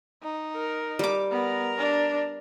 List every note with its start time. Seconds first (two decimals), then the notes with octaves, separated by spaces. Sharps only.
0.23 D#4
0.56 A#4
0.99 G3 D6
1.32 B3 A#4 A#5
1.78 D4